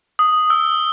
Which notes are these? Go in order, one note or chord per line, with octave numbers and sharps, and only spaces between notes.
D#6
E6